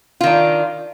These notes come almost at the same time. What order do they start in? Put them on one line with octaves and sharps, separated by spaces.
F4 D#3 D4